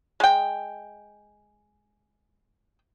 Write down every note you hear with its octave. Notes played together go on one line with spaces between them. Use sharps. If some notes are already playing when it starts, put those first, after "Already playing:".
G#3 G5